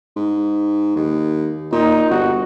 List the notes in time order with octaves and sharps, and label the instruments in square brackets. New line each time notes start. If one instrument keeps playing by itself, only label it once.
[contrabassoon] G#2
D#2
[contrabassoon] A#2 [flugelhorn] D#4
[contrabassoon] G1 [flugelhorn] F#4